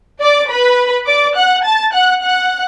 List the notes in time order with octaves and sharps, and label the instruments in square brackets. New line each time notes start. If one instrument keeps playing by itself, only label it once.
[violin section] D5 D6
B4 B5
D5 D6
F#5 F#6
A5 A6
F#5 F#6
F#5 F#6